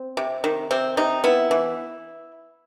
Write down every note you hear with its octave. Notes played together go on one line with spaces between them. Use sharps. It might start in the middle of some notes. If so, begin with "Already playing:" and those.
Already playing: C4
C3
D#3
C3 C4
C3 D#4
B3 E4
E3